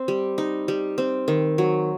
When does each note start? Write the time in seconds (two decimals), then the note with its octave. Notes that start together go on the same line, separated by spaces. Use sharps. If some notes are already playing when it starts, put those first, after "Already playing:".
Already playing: C4
0.08 G3
0.38 D#4
0.68 G3
0.98 C4
1.28 D#3
1.58 F#3